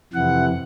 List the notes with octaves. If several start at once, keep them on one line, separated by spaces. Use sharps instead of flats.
F2 C3 E3 F#5